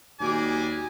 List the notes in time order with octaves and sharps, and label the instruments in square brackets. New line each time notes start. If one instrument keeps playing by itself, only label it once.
[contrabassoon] D#2 [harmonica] G3 G#3 D6 [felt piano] F#4 [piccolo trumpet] G#5